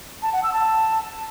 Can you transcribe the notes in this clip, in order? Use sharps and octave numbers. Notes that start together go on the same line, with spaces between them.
A5
F#5
E6
A5